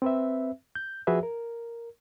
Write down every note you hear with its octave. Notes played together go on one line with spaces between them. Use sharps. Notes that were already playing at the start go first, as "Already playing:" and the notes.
C4 B4 E5
G6
F3 F#4 G#4 B4 E5
A#4